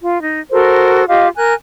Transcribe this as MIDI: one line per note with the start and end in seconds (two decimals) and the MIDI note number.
0.01 0.20 65
0.22 0.41 63
0.51 1.04 66
0.51 1.04 69
0.51 1.04 70
0.51 1.04 72
1.09 1.28 65
1.09 1.28 67
1.09 1.28 75
1.09 1.28 77
1.36 1.53 70
1.36 1.53 80
1.36 1.53 90